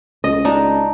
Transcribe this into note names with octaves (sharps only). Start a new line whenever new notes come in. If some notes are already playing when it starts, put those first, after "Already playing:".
C#2 D#5
D4 D#4